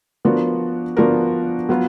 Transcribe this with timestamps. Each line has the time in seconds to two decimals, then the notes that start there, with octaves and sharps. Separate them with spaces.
0.25 F3 B3 D4 F#4 A#4
0.97 F3 B3 D4 F#4 A#4
1.69 F#3 B3 F4